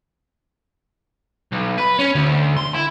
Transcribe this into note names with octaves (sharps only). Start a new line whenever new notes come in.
B1
B4
C#4
D2
C6
E4